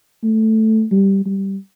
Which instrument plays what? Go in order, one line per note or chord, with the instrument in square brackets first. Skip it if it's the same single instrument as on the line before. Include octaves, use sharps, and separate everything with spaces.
[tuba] A3
G3
G3